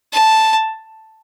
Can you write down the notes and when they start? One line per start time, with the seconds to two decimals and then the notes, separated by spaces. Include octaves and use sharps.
0.13 A5